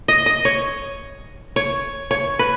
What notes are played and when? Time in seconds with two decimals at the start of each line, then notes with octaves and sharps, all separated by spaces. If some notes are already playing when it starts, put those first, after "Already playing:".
0.08 D#5
0.26 D#5
0.45 C#5
1.56 C#5
2.11 C#5
2.39 B4